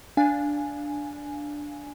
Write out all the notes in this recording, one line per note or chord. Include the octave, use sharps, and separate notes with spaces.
D4 F5 G#5